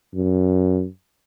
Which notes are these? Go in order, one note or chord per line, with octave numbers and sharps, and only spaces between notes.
F#2